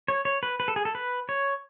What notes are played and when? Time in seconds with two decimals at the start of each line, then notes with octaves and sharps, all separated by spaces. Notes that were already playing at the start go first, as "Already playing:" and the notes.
0.08 C#5
0.25 C#5
0.43 B4
0.60 B4
0.68 A4
0.76 G#4
0.85 A4
0.95 B4
1.29 C#5